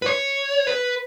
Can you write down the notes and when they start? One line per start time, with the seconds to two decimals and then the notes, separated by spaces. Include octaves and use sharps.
0.02 B4
0.06 C#5
0.67 B4